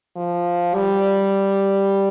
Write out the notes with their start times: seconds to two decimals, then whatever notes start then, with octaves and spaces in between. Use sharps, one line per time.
0.17 F3
0.75 G3